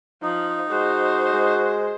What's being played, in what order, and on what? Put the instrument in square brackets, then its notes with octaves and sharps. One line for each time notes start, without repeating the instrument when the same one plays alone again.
[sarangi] F3 [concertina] D#4
[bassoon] G#3 [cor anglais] F#4 [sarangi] C5
[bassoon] G#3